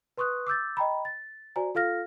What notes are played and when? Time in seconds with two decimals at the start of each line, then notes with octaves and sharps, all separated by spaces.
0.18 B4 C6 C#6 D#6 F#6
0.47 D6 E6 G6 A6
0.77 D#5 G5 A#5 B5
1.05 A6
1.56 F#4 C5 D5 G#5 A#5
1.75 F4 A4 F5 F6 A#6